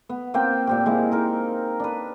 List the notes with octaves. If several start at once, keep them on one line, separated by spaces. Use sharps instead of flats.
B3
A#3 C4 C5 G5
A#2 C4 G4
G#3 A#3 E4
D#4 A#4
D4 B4